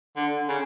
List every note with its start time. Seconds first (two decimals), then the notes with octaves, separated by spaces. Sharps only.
0.16 D3
0.49 C#3